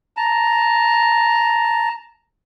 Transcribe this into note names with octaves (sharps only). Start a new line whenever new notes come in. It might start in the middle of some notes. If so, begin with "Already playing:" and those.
A5 A#5